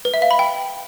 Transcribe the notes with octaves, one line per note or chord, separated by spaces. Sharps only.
B4
E5
F5
B5
G5